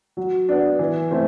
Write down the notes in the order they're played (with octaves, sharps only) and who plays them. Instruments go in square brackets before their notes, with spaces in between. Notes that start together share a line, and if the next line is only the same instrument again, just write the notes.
[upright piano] F#3
B3 D4
E3
A3 C4 E4